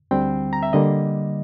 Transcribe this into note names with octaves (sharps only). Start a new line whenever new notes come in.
D2 D3 G3 C4 G5
A#5
E5
D3 G3 A#3 D#5